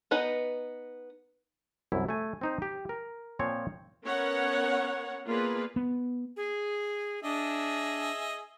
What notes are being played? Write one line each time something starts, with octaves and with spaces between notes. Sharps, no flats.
B3 D#4 B4 D#5
C2 F#2 E4
A3 G#5
C4 D#4 C5
G4
A#4
A#2 F3 C4 C#5
B3 C#4 A#4 C#5 F#5
A#3 B3 F4 G#4 B4 D5
B3
G#4
D4 G#4 D#5 E5